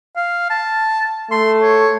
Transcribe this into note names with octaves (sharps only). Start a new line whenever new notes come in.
F5
A5
A3 C6
C#5